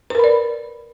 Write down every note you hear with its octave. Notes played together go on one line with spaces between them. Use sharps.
A#4 B4 D5 B5